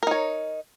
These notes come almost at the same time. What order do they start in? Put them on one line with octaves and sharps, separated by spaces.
A#4 D#4 C#5